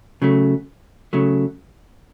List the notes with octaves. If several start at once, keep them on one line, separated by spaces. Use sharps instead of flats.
C#3 F#3 A3
C#3 F#3 A3